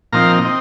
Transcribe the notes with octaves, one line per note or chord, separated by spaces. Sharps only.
A#2 F3 C4 D#4 F5 A#5
C4 D#4